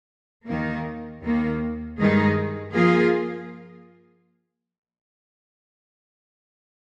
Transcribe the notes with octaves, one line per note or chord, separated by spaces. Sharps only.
D#2 D#3 A#3
D#2 D#3 A#3
G2 D#3 G#3 D#4 G#4
F3 A#3 F4 G#4